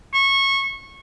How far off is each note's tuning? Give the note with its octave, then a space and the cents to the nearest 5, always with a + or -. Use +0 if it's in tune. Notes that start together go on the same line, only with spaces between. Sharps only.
C#6 -20